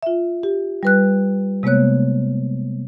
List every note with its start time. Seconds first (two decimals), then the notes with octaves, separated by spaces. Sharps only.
0.03 F4 E5
0.43 G4
0.83 G3 B4 F#6
1.63 C3 G#3 A#3 B3 C#5 F#6